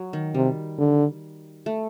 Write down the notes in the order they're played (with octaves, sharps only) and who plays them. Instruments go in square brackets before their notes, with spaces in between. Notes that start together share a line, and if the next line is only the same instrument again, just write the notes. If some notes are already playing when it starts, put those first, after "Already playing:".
Already playing: [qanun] F#3
D#3
[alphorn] C3 [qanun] G3
[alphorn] D3
[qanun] A3